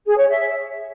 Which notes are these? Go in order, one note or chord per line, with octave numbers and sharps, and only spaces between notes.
G#4
C#5
E5